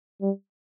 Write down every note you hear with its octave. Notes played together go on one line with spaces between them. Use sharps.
G3